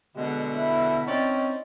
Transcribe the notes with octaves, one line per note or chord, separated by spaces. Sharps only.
B2 D3 G#3
E4
C4 C#4 D#4 D5